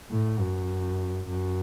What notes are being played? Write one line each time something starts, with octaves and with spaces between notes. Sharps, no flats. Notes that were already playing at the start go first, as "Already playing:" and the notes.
A2
F#2
F#2